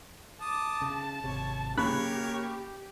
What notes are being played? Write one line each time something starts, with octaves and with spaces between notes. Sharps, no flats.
A5 D6 D#6
C#3
G#1 C3 C#5
C#3 A#3 G4 A#4 C#5 B5 F#6